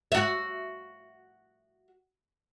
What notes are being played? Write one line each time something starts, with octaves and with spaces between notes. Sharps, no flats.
F#4 E5